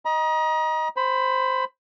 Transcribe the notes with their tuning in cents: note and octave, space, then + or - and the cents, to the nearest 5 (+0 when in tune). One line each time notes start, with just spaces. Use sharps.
D#5 +0 A#5 +40
C5 +0 B5 +15